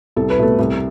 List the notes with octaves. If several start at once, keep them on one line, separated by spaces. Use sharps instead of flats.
C2 A4
B4
B2 A3 A4
C2